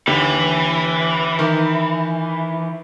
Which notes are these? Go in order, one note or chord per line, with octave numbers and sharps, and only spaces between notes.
D#2 D3 E3
D#3